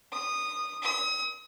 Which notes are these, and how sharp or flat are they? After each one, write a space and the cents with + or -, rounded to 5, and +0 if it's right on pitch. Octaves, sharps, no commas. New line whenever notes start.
D#6 -15
D#6 +40